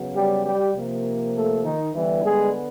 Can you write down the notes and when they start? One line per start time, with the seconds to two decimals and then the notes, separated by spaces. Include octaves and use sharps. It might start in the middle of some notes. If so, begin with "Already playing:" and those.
Already playing: C#3 F#3 B3
0.15 G3 G4
0.45 G3 G4
0.74 C3 F3 A#3
1.34 A3 A4
1.64 D#3 D#4
1.94 D3 E3 G3 B3 E4
2.24 G#3 G#4